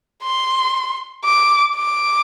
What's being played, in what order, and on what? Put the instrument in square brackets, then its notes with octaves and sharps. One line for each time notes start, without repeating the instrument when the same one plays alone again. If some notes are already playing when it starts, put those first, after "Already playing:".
[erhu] C6
D6
D6